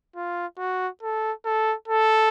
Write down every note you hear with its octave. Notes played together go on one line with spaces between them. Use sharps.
F4
F#4
A4
A4
A4